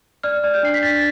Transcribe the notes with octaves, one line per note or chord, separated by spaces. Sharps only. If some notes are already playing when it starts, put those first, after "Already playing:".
D5 F6
D5
G6
D4 C7
B6
D4 A6